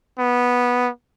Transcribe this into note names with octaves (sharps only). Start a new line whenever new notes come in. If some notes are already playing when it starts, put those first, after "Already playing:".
B3